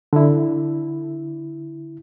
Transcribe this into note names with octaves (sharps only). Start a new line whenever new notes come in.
D3 E4